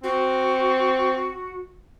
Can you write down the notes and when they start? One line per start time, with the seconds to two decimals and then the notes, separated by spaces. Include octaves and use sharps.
0.04 C4 F#4